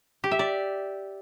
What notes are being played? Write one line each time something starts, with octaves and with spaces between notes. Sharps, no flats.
G4
E5
D5